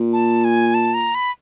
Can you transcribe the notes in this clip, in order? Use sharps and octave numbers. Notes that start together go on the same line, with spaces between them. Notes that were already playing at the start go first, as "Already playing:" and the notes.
Already playing: A#2
A5
G#5
A5
A#5
B5